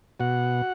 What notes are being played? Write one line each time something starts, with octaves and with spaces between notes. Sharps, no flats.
B2 F#4 F#5